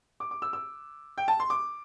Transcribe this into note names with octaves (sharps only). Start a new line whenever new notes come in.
D6
D6
E6
E6
G5
A5
C6
D6